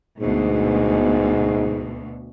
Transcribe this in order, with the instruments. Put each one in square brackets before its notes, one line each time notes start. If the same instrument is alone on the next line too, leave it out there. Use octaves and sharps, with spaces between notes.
[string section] D2 B2 [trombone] G#2